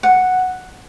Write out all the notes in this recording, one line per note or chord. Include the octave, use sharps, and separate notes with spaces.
F#5